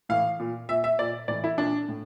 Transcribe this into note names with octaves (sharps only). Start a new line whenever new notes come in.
A2 E3 F5
A#2
A#2 E5
E5
A#2 D5
A2 E3 D5
E4
A#2 D4
A2